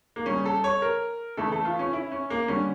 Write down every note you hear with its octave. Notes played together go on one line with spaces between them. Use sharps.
A#3
C#3 G3 C#4
A4
C#5
A#4
C#3 E3 A3 A4
A4
F4
C#4
E4
C#4
A#3
D3 G3 C#4